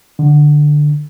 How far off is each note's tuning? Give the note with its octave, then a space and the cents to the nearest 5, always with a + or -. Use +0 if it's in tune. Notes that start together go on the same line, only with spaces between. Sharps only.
D3 +10